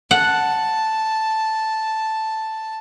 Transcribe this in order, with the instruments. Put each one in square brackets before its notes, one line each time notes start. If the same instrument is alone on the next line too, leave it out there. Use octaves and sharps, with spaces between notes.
[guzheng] F#5 [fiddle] A5